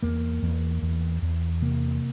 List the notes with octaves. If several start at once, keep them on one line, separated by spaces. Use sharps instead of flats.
E2 A#3
E2
E2
E2
C3 A#3